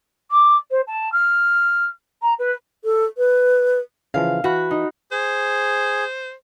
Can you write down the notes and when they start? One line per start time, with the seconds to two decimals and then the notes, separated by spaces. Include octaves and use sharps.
0.31 D6
0.71 C5
0.87 A5
1.12 F6
2.21 A#5
2.38 B4
2.84 A4
3.18 B4
4.14 C#3 E3 F3 F5
4.44 E3 F#4 B5 F#6
4.71 D#4
5.12 G#4 C5